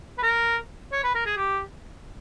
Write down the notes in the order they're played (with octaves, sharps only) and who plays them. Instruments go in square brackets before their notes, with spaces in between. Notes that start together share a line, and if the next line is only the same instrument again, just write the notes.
[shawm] B4
A#4
C#5
B4
A#4
G#4
G4